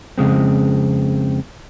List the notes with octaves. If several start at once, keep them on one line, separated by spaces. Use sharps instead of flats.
F2 C#3 G#3 C4